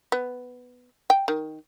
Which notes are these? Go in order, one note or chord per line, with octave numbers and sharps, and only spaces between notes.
B3
G5
D#3